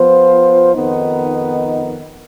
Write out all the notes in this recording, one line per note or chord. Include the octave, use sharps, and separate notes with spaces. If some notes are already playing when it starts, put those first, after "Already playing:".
Already playing: F3 B3 F4 C5
F2 D#3 B3 D#4